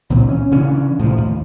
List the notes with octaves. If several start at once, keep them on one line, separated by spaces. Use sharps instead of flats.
C#2 A#2 E3 C4
C#4
C#3 E3 C#4 D4
A2 C3 F3
D#2